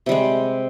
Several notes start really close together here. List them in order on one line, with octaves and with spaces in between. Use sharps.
C3 G3 G#3